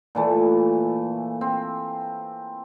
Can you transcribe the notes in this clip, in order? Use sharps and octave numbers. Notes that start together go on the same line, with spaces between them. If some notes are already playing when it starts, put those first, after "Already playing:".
A#2 E3 A3
C4